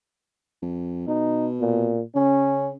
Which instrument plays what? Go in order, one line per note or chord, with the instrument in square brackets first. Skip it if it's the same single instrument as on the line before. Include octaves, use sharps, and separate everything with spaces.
[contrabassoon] F2
[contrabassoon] B2 [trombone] D#4
[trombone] A#2
[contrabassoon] C#3 [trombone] C#4